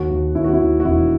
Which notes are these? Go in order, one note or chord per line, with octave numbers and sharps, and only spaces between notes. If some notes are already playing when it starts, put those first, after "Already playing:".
Already playing: D#2 F#4
D#2
D#2 E4
F#4
E4
D#2
F#4
E1 E4